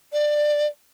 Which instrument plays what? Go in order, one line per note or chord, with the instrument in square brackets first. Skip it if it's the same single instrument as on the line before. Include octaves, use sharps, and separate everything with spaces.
[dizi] D5